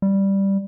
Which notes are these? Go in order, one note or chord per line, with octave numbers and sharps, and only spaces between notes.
G3